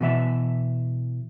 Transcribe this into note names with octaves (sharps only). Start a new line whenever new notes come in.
B2 E3 E5 A5